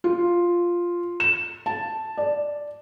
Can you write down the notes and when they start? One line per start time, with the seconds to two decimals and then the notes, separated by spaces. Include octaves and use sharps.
0.04 F4
1.20 E7
1.66 A5
2.17 D5